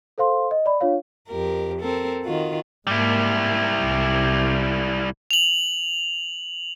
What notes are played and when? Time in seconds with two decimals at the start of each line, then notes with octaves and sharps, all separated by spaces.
0.18 A4 C5 F5 C6
0.51 D#5
0.66 D5 B5
0.81 D4 F4 C#5 F5
1.29 F2 G4 A#4
1.81 C4 A4 A#4
2.24 D#3 F4 F#4
2.87 G#2 G3 A#3 E4
3.81 C2 C3
5.31 F7 F#7